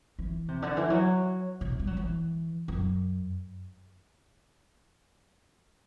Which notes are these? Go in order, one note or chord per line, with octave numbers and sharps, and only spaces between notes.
E3
C3
D3
E3
F#3
C3
G3
F#3
E3
F#2